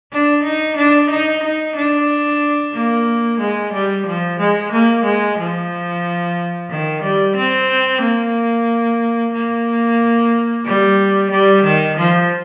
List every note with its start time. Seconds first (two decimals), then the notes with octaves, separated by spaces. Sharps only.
0.12 D4
0.43 D#4
0.77 D4
1.10 D#4
1.43 D#4
1.76 D4
2.74 A#3
3.40 G#3
3.73 G3
4.06 F3
4.39 G#3
4.72 A#3
5.05 G#3
5.38 F3
6.70 D#3
7.03 G3
7.36 C4
8.01 A#3
9.33 A#3
10.65 G3
11.30 G3
11.64 D#3
11.97 F3